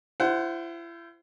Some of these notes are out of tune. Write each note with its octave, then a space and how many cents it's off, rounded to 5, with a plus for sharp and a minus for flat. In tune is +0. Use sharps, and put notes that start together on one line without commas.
E4 +40 C5 -5 F#5 +25